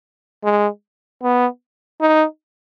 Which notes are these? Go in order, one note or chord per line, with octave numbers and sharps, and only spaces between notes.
G#3
B3
D#4